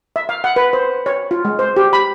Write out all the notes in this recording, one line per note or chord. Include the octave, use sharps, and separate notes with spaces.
E5
F5
F#5
B4
C5
C#5
F4
G#3
C5
G4
B5